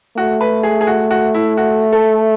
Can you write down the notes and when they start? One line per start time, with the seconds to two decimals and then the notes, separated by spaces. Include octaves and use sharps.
0.17 A3 F#4
0.41 B4
0.63 G#4
0.81 G#4
0.87 F#4
1.11 F#4
1.34 E4
1.57 F#4
1.93 A4